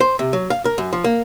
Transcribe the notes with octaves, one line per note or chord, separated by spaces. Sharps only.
C5
C3
F#3
F5
A#4
F#2
F3
A#3